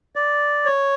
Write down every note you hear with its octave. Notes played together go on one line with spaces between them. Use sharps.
D5
C#5